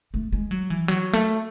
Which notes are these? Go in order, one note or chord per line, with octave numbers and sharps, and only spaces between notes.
A3
G#3
F#3
E3
F#3
A3